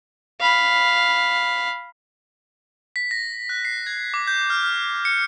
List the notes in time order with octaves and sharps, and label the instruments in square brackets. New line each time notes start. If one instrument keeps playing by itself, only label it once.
[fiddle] F5 B5
[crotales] B6
A#6
F#6
C7
G#6
D6
G6
F6
F6
C#7